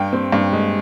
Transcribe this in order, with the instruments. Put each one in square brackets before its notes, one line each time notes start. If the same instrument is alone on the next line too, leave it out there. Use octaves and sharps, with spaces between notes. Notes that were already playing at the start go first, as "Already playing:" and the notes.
Already playing: [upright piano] G2 G5
C4
G2
G#3